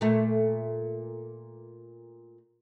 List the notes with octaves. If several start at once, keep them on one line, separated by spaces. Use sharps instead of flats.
A#2 A3